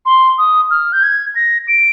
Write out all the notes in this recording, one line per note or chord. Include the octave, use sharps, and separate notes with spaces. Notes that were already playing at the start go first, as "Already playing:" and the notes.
C6
D#6
F6
G6
G#6
A#6
D7